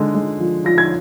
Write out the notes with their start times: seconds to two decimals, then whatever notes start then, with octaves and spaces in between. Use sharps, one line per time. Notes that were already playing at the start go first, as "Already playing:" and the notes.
Already playing: D3 G#3
0.15 G#3
0.40 F3
0.65 F3 A#6
0.78 G#6